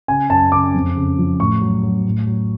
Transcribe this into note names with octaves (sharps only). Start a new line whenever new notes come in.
C#3 G#5
F#2 A5
C#3 D6
F2
C#3
F3
A2 C#6
F#3
F#3
A2
F#3